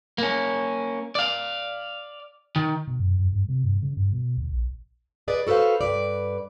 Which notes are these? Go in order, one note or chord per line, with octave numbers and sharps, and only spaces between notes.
A#3 C#4
D5 F5
D#3
B2
F#2
F#2
G2
C3
G2
C#3
G2
B2
D2
A#1
G#4 B4 D5 D#5
F#4 A4 B4 C5 F5
G2 B4 D5